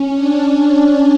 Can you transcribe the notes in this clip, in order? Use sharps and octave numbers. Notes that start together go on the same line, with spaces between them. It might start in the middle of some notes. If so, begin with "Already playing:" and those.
Already playing: C#4
D4